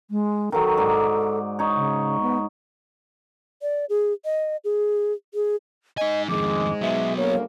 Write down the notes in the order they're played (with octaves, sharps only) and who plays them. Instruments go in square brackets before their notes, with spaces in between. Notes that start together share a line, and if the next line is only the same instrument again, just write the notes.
[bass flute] G#3
[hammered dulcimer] D#3 F#3 [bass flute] A4
[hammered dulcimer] G#2 D5
D#4 C#5
[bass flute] C#3
B3
[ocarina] D5
G#4
D#5
G#4
G#4
[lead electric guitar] D#4 G#5 [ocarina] D#5
[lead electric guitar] F2 D#3 [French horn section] G#2 G#3 [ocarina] D6
[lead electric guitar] F#3 B3 [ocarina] E5
[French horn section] D2 C#3 A#3 [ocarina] C#5